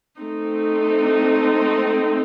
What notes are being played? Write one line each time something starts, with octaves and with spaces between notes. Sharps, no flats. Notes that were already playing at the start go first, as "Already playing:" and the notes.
A3 C4 D#4